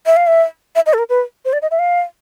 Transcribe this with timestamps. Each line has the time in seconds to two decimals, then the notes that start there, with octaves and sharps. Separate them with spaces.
0.06 E5
0.17 F5
0.27 E5
0.75 E5
0.86 D#5
0.93 A4
0.99 A#4
1.09 B4
1.45 C5
1.53 D5
1.62 D#5
1.71 E5
1.79 F5